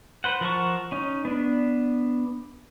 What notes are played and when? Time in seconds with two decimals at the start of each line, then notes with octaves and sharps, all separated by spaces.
0.24 B4 C5 F#5
0.41 F3 A#4 F#5 A5 C#6
0.92 C#4 D#4
1.25 B3 D4